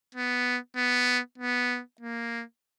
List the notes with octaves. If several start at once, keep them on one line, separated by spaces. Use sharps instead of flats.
B3
B3
B3
A#3